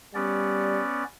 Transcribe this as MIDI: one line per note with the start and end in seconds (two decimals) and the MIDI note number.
0.15 0.81 55
0.15 1.04 59
0.15 1.04 61
0.15 1.04 74